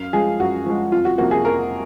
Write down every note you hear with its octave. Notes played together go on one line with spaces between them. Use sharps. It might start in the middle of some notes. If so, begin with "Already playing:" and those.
Already playing: F#2 F5
F3 G#3 G#4
F#2 F#4
F3 G#3
F2 F4
F#4
C3 F3 A#3 F#4
G#4
F2 A#4